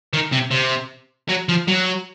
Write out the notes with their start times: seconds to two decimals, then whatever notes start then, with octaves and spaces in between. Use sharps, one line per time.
0.13 D#3
0.32 C3
0.51 C3
1.29 F#3
1.49 F3
1.68 F#3